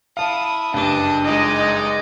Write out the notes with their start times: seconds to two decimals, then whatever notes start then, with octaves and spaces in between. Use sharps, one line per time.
0.17 E4 F5 A5 D#6
0.74 F#1 G2 D4 D#5
1.25 G#3 D#4 D5 D#5